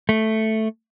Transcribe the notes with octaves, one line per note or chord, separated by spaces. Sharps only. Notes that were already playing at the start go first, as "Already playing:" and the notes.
A3